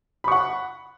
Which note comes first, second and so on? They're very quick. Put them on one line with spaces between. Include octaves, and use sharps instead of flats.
B5 C#6 F#5